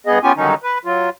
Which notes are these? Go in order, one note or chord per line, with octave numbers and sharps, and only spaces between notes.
G2 B3 G#4 D#5
B3 C#4 F4 G4 G#5
G2 D3 D#3 F#3 C#4 D#4
B4
F#3 F4